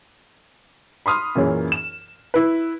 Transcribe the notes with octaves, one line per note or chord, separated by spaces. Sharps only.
B5 C6 D#6 F6
F#2 A#2 E3 C#4 G#4
E7
E4 B4